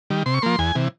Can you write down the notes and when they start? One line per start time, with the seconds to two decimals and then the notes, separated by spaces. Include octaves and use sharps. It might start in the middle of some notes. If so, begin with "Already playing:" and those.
0.10 D#3 G3
0.26 C3 C6
0.34 C#6
0.42 F3 A#3 C6
0.59 E2 G#5
0.75 C3 E3